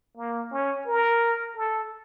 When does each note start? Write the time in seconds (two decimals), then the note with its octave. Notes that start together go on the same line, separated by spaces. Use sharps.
0.17 A#3
0.52 C#4
0.87 A#4
1.57 A4